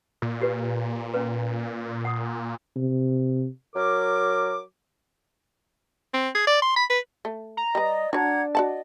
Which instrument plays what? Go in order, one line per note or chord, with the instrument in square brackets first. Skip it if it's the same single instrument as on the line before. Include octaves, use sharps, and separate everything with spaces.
[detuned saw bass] A#2
[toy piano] F4 G4 B4
C#4 B4
F#5 D#6
[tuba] C3
[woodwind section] F#3 A#4 D6
[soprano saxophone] C4
G#4
D5
C6
B5
B4
[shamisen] A3
[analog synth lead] A#5
[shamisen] G3 B4 [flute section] D5 D#5 D#6
[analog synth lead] D4 [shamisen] F#4 C#5 [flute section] F#5 A#5 G#6
[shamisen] F#4 F#5 A5 [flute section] D5 D#5